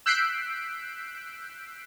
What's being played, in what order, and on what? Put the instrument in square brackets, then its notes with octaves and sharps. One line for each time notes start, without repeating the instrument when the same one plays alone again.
[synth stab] E6 F#6 G6 B6 C7 D7